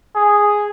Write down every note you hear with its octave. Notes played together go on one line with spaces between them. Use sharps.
G#4